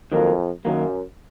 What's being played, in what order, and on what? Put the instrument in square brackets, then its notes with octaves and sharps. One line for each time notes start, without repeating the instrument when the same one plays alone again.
[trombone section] F2 [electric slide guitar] D#3 F#3 A#3
[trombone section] F#2 [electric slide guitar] D#3 F#3 A#3